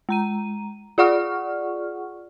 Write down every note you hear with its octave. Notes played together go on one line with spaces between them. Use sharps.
G#3 A#5 D#7
F4 G#4 D5 F#5 C#6 F6